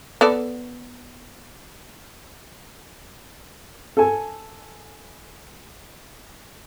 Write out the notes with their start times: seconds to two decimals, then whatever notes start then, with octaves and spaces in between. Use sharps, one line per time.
0.21 B3 A4 D5
3.97 A4 G#5